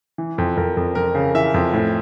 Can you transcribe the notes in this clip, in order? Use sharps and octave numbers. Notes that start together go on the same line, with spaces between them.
E3
F2
F2 A#4
F2
F2 A#4
C#3
E3 E5
F2
A2